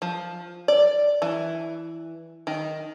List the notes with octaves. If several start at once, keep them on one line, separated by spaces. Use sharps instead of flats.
F3
D5
E3
D#3